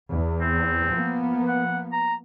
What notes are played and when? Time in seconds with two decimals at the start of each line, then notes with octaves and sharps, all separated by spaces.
0.10 E2
0.41 C4
0.92 F3 A#3 B3
1.48 F#5
1.92 A#5